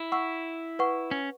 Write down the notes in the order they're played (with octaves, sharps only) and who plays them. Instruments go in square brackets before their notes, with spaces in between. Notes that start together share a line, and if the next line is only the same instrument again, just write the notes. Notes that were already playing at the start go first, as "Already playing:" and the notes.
Already playing: [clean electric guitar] E4
[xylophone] F#5 C#6 E6
B4 F#5 C#6
[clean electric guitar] C#4